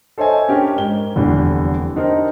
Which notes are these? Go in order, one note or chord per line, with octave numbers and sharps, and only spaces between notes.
A4 C5 C#5 D#5 E5 G#5
C#4 D4 G4 A#4
G#2 G7
F1 E2 D3 G3
D4 D#4 G4 A#4 C5